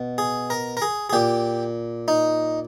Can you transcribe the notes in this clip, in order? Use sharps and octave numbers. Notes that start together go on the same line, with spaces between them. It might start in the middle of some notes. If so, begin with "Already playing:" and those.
Already playing: B2
G#4
A#4
A#4
G#4
G#4
A#2 G4
D#4